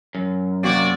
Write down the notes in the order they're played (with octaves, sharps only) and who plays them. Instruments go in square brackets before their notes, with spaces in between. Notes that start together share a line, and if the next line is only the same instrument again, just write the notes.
[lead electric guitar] F#2
[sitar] C3 F#4 [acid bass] A#3 [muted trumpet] D5